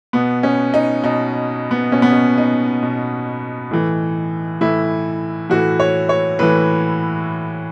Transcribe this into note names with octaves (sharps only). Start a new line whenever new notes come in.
B2 B3
C#4
D#4
B2 D#4
B3
B2 C#4
B3
C#4
D#4
B2
A2 E3
A2 E3 E4
A2 E3 F#4
C#5
C#5
A2 E3 B4